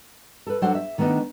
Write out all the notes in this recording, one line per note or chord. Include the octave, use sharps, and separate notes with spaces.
A4 B4
F#3 D4 A4 C5 F#5
E5
D#3 A3 B3 D4 D#4